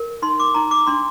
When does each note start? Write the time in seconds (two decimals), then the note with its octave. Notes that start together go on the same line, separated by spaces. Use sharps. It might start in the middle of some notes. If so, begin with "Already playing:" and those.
Already playing: A#4
0.22 D#4 C6
0.40 D6
0.54 D#4 A#5
0.71 D6
0.87 D4 C6